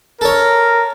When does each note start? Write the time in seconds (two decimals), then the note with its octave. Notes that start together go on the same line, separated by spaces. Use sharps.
0.21 A4 A#4 C#5